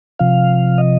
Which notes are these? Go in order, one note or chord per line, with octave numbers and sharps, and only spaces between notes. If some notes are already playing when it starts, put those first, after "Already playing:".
C3 F3 F5
D#5